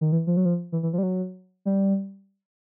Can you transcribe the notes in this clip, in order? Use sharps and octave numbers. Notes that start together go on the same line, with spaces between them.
D#3
E3
F3
F#3
F3
E3
E3
F3
G3
F#3
G3